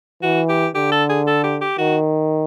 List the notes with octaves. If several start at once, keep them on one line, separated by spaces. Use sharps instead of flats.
E3 F#4
G4
D3 G4
A4
G#4
A4
G4
G4
D#3 F#4